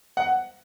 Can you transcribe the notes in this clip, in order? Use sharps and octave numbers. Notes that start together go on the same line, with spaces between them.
F#5